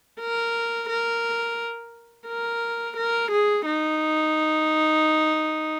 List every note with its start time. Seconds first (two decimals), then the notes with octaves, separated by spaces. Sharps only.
0.20 A#4
0.89 A#4
2.28 A#4
2.97 A#4
3.31 G#4
3.66 D#4